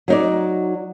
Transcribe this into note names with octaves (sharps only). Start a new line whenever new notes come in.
F#3 D#4 D5